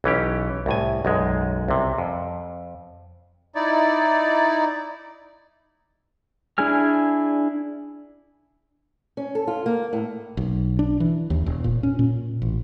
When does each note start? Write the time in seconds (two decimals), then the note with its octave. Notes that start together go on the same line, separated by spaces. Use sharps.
0.04 B1 E3 C#4 G4
0.66 C2 A2 G#5
1.05 B1 F#2 G#3
1.68 C2 C3
1.98 F2
3.55 D#4 E4 D5
6.58 D4 E4 G#4 G#5 F6
9.17 C#4
9.35 A4
9.47 F4
9.66 A#3
9.93 A2
10.37 B1
10.79 D4
11.00 E3
11.30 D#2
11.46 E1
11.64 A#2
11.83 C#4
11.99 A#2
12.42 A1